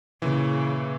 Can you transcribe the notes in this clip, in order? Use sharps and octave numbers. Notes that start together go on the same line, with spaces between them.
A#2 C#3 E3